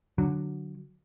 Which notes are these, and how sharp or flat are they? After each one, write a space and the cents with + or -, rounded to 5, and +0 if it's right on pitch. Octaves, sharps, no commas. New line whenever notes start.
D3 +5 F#3 -5